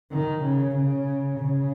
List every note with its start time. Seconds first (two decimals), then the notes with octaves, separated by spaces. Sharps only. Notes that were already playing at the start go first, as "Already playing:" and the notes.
0.12 D#3
0.43 C#3
0.76 C#3
1.39 C#3